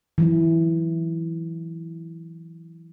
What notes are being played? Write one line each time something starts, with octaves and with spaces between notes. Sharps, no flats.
E3 F#3 E4